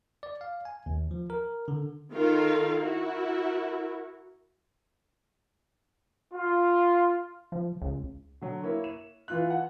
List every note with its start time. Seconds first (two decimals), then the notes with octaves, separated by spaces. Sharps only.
0.23 D5
0.41 F5
0.65 G#5
0.86 D#2
1.11 F3
1.30 A#4
1.68 D3
2.12 D#3 F4 A4 A#4 F5
2.79 E4 F#4 A#4
6.34 F4
7.52 F3
7.82 C#2
8.41 D3 F#3
8.64 A#3 E4 C#5
8.84 E7
9.28 E3 F4 F#6
9.50 F#5